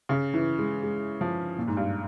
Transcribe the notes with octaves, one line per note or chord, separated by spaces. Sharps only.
C#3
E3
G#3
G#3
F3
A#2
G#2
G2